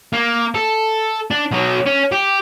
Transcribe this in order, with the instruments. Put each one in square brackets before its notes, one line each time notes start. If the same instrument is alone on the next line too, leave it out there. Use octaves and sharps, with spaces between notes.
[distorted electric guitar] A#3
A4
D4
B2 F#3
C#4
G4